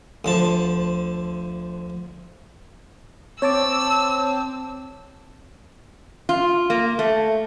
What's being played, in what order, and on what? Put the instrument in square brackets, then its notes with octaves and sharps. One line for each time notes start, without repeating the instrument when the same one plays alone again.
[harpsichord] D2 F3 A5
[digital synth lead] C4 [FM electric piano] C#5 A5 D6 [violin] E6
[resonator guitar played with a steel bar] F4
A#3
A3